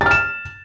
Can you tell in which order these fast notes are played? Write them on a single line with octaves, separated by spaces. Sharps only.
A6 F6 E7